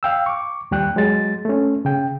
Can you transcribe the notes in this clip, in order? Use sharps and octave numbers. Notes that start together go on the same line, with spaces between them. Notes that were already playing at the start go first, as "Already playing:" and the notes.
F5 G5 E6
C#6 D6
D#2 G3 G5 F#6
F#3 G#3 A6
A3 C#4
C#3 G5